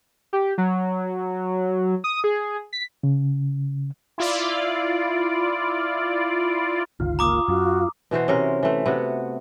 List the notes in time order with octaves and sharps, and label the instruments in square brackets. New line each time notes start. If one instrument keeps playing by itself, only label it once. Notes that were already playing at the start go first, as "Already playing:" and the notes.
[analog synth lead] G4
F#3
D#6
G#4
B6
[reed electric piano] C#3
[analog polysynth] E4 F4 D5
[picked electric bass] G1 C#2 D#3 [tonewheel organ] F4
[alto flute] A#3 [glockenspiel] A#5 D6 D#6
[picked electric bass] F#2 [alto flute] F#4
[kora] B2 E3 F#4 C5
C3 C#4 A#4 C5
E3 A3
C3 B3 F#4